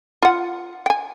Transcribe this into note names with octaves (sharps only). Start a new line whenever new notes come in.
F4 F#5
G5 G#5